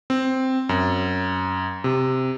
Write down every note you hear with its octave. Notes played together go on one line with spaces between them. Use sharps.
C4
F#2
C3